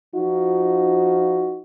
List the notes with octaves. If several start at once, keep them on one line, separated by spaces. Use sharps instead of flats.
F3 D#4 F4 F#4